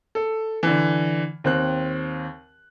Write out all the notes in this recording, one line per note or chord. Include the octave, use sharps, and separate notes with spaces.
A4
D3 E3
D#2 C4 F#6